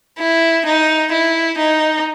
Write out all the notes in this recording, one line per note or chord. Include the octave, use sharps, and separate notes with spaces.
E4
D#4
E4
D#4